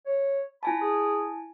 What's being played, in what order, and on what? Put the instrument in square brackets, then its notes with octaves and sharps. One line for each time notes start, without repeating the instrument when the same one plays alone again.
[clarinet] C#5
[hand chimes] E4 G#5 A5 [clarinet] B5
[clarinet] G#4